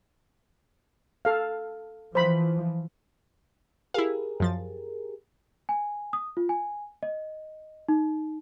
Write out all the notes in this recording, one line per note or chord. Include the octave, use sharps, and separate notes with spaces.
A4 F5
E3 F3 C5 B5
E4 G4 G#4 A#4 F5
F#2 F3 A6
G#5
D#6
F4
G#5
D#5
D#4